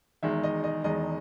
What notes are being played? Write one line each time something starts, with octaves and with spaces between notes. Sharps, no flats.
E1 E2 D#3 G#3 E5
D#5
D#5
E1 E2 D#3 G#3 D#5